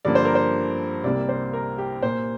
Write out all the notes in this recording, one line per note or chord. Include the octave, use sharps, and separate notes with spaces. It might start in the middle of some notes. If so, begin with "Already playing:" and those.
G2 D3 F3 A#3 D5
C5
A#4
C5
C2 C3 G3 A#3 D5
C5
A#4
G4
A#2 A#3 C5